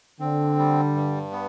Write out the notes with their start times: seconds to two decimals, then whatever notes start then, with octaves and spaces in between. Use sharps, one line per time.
0.20 D3 C4
0.58 G3
0.95 G2
1.32 B3